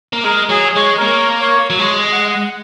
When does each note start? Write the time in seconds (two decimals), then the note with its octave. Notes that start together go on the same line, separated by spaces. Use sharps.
0.13 A#3
0.24 G#3 A#4
0.49 F#3 G#4
0.76 G#3 C#5
0.97 A#4
1.01 A#3 C#5
1.40 C#5
1.70 F#3
1.79 G#3 C#5
2.04 D#5
2.12 F#5
2.20 D#5
2.31 F#5